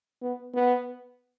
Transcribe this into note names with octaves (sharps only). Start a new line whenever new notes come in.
B3
B3